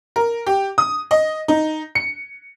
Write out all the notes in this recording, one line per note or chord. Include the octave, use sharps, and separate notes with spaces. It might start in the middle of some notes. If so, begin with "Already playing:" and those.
A#4
G4
D#6
D#5
D#4
C#7